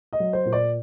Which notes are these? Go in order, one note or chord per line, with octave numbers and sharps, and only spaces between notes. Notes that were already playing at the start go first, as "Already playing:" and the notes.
D#5
F#3
C5
A#2
D5